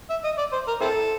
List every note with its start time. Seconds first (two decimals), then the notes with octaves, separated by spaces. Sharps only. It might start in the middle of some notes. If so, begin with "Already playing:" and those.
0.10 E5
0.24 D#5
0.38 D5
0.53 C5
0.68 A#4
0.81 C4 E4 A4